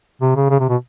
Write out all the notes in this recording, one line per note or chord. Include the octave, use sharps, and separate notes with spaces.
C3
C#3
C#3
C3
B2